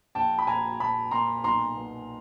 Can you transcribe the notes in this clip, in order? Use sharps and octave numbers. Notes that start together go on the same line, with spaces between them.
A#1 G5 A5
B5
A#2 G#5 A#5
A#2 A5 B5
A#2 A#5 C6
B1 A#5 C6
B2